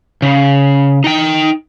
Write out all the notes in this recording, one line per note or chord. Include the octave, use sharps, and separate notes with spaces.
C#3
D#4 G5